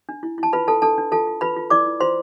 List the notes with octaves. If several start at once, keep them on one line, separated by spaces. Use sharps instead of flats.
D4
E4
E4 A5
F4 B4 B5
F4 A4 A5
D4 A4 A5
D4
F4 A4 A5
F4
F4 B4 B5
F4
E4 D5 D6
E4
F4 C5 C6